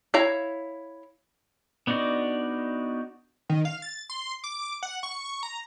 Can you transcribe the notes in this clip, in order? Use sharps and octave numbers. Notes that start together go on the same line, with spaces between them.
E4 C#5 F5 A#5
B3 D4 D#4 F#4 D5
D#3
F5
A6
C6
D6
F#5
C#6
A#5